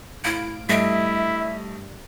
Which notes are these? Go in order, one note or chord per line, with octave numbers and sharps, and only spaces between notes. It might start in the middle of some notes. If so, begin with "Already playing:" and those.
A2 E4 F5 D7
G2 G3 A3 E4 D#5 E5 D7